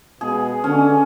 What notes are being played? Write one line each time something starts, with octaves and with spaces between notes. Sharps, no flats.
B2 G#3 B3 G#4
D3 C#4